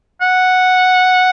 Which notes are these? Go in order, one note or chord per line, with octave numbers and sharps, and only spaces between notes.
F#5